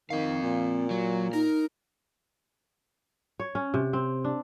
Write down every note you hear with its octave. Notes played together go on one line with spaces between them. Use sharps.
D#3 C4 F5
A#2
F#3
D#4 A#4
C#5
C#4
C3
C4
D4